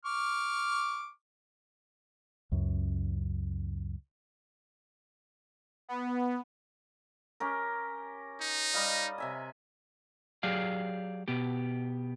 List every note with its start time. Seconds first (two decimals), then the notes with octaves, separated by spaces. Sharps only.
0.05 C#6 D6 F6
2.52 C#2 F#2
5.89 B3
7.40 C#4 G4 A#4
8.41 D#4
8.74 G3 D#5 F5
9.18 C3 E5 G#5
10.43 F#3 G4 G#4 D5 F5
11.28 B2 B3 G4